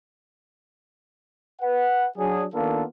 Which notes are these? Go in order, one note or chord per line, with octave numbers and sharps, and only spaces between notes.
B4 F#5
F#3 D4 G#4
D#3 A#3 B3 D4 F4 A4